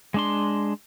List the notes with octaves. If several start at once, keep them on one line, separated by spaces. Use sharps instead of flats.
G#3 D4 C6